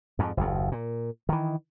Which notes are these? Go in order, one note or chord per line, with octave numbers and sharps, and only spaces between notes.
F2 G#2
F#1 D#2
A#2
D#3 E3